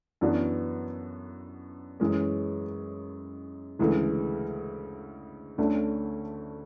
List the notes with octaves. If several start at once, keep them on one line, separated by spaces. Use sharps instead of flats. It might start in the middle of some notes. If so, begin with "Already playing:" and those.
F#2 E3 B3 D4 F#4
F#2 E3 G#3 C#4
D2 C#3 E3 G#3
D2 D3 A3 C#4